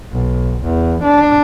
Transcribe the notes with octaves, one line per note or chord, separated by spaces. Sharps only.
B1
E2
D4